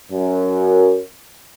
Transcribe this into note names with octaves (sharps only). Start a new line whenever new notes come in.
F#2